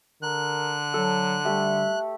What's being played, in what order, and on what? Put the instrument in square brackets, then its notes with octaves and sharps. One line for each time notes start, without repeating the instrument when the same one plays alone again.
[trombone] D3 [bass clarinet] A#4 [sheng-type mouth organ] F#6
[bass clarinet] F#3 [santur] A4
[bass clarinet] G3 [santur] A3 G4